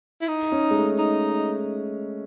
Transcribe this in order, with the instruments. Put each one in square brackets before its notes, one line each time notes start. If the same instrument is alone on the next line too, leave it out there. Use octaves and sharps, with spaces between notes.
[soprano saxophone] E4
D#4
[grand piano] C#4
G#3
A3
[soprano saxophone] D#4